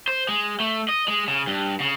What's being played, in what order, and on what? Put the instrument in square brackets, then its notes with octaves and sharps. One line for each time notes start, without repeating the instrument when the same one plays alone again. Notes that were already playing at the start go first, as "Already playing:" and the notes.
[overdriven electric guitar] C5
G#3
A3
D#5
G#3
C#3
G2
C#3